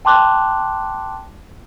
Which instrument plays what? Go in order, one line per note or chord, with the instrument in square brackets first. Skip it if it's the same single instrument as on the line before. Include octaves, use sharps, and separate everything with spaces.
[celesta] G5 A5 C6 D6 F#6